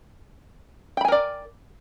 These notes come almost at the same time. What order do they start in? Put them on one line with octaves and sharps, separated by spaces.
G5 B5 G#5 A#4 D5